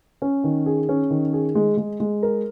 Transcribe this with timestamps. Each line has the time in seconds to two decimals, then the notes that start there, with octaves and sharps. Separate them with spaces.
0.22 C#4
0.44 D#3
0.66 G#4
0.89 C#4
1.10 D#3
1.33 G#4
1.55 G#3
1.77 G#3
2.00 G#3
2.23 A#4